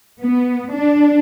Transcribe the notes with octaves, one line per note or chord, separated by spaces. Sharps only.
B3
D4